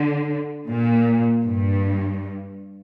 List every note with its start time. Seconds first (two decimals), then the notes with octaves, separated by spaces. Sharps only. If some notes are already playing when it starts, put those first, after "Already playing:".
Already playing: D3
0.68 A#2
1.45 G2